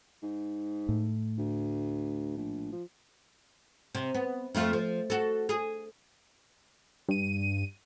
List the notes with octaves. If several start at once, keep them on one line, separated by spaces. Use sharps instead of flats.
G#2
A2
D2
A#1
F3
C3
B3
F2 A3 F4
F3
F#4 A4
G#4
G2 D#7